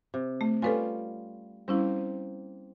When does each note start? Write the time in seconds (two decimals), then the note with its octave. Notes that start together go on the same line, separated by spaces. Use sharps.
0.14 C3
0.41 A3
0.62 G3 C#4 F4 A4 B4 G#5
1.68 G3 A#3 C4 C#4 E4